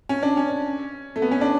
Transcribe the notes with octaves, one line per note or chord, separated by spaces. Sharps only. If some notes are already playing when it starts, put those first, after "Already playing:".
C#4
D4
C#4
A3
B3
C#4
D4